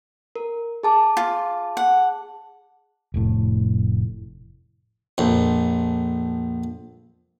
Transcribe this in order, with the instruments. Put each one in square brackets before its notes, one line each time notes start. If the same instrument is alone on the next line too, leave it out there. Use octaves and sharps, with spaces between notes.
[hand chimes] A#4
G#4 A5 D6
[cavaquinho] F4
F#5
[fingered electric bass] F1 A2
[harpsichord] A#1 F2